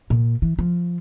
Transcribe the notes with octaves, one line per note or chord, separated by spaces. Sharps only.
A#2
E3
F3